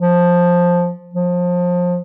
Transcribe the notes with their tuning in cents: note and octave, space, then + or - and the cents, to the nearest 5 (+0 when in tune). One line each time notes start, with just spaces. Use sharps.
F3 +10
F3 +25